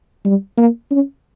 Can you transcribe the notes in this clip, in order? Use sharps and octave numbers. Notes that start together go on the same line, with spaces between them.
G3
A#3
C#4